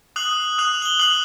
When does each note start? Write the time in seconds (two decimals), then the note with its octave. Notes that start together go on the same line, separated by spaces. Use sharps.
0.16 D#6 F#6 F#7
0.59 D#6 F#6 F7
0.82 F#7
0.86 G7
0.99 D#6 F#6 F#7